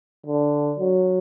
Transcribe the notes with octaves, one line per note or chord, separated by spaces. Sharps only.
D3
F#3